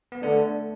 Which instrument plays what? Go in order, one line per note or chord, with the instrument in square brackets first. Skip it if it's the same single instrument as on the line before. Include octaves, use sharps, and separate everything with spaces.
[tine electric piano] B3
[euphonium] D3 [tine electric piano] A3 D4